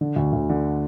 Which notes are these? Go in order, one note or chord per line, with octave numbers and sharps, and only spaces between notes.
D3
D2
D2
D3